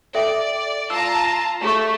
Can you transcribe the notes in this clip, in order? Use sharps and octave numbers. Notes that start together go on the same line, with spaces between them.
A4 D5 E5 G5
F4 A5 A#5 E6
A3 G4 G#4 C#6